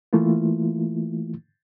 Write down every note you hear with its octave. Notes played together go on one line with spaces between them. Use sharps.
E3 A3 A#3 E4 F4